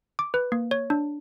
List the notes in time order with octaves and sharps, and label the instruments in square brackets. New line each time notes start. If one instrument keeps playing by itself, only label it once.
[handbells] D6
B4
A#3
C#5
D4